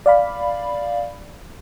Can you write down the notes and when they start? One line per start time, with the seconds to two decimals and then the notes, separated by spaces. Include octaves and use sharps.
0.06 D5 F5 B5